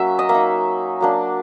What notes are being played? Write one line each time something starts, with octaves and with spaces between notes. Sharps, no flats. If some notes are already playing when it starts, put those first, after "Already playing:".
Already playing: F#3 A#3 C#4 E5
D#5
A#3 E5
D#4
F#3 A#3 D4